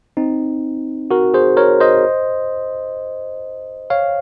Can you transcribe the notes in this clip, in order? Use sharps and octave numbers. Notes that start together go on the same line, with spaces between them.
C4 D#4
F#4 A#4
G#4 C5
A#4 C#5
C5 D#5
C#5 F5